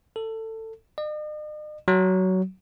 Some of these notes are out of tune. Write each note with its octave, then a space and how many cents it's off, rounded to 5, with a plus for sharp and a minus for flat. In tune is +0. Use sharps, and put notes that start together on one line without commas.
A4 +20
D#5 -45
F#3 +15